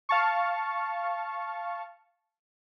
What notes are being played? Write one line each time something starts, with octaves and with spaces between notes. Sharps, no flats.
F5 A5 C#6